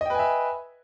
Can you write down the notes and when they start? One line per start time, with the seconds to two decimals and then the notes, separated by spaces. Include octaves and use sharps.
0.01 D#5
0.05 G5
0.10 B4
0.15 G#5
0.19 E5